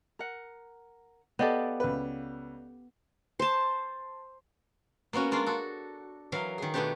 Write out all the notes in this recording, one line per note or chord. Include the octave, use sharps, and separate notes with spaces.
A#4 F#5
B3 G4 A4 D5 D#5 F5
C#2 B4
C5 A5
A#3 B3 C#4 F#4
G#3 A#3 D4 F4 F#4
F#4 A4
E3 F#3 A#4 F5
D#3 G#4
B2 D#3 A3 B3 D4 G4